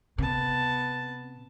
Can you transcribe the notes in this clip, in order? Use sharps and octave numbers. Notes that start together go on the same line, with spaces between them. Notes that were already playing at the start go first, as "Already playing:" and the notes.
C3 B3 A5